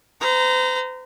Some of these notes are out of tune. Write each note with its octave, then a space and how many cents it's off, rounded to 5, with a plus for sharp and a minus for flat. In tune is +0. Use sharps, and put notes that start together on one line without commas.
C5 -40 A#5 +0